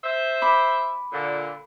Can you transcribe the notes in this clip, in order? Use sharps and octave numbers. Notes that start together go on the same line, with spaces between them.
C5 E5
B5 D6
A#2 D3